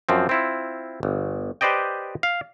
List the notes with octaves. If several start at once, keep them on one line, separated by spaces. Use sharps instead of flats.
F#2 F3 C4
C4 E4 F4
G1
G4 B4 C5 D5 D#5 G5
F5